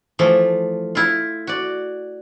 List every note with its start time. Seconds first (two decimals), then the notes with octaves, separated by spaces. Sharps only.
0.19 E3 F3 A3
0.95 E4 F4
1.47 F#4 D5